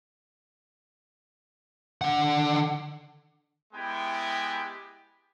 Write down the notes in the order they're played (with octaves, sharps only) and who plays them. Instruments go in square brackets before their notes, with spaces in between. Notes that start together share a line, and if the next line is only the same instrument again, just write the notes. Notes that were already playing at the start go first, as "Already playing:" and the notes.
[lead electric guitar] D3 F#5
[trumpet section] G#3 B3 E4 G4 G5 G#5